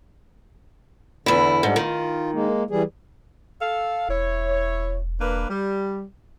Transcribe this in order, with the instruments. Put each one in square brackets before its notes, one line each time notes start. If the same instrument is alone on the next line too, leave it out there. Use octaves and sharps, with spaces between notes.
[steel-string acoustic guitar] E2 E4 [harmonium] D3
[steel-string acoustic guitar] G#2 [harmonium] G3 D4 A4
[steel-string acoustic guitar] D#3 [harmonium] F4
[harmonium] G#3 A#3
E3 G3 G#4
[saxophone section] A4 F5
[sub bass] E1 [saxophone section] E4 C#5
[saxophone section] A#3 D4 B4
G3